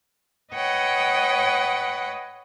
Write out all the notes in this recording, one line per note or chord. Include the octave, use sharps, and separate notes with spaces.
B4 C#5 D#5 F#5 G5